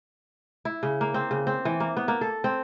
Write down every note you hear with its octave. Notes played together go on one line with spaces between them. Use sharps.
E4
C#3
A#3
C4
C#3
C4
E3
A#3
B3
A#3
A4
C4